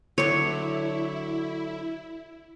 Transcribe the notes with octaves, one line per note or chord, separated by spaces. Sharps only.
D3 F#3 E4 C#5